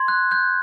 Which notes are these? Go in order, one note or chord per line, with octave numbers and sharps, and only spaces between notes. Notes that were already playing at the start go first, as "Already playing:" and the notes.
Already playing: C6 G#6
F#6
F#6 G6